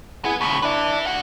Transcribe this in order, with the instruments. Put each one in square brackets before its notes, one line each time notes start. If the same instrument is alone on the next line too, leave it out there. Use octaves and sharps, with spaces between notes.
[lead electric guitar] B3 [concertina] E4 G#4
[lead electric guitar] D#2 C#3 [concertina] B5 C#6
[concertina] D4 [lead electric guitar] B4 E5
[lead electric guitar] A3 F#5